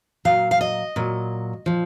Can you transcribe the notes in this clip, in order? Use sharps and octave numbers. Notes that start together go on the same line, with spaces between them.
A#2 F#3 F5
F5
D#5
A#2 F#3
A#2 F3